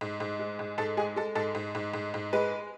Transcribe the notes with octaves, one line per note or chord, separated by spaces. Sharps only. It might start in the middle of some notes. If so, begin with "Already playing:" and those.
G#2
G#2
G#3
G#2
G#2 A4
G#3 G#4
G#3 A4
G#2 A4
G#2
G#2
G#2
G#2
G#3 B4